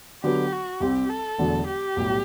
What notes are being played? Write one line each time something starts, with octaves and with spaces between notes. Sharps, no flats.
D3 F#3 B3 G4
F#4
C2 C3 G3 C4 G4
A4
E1 E2 D3 F#3 A3
G4
B1 A2 G3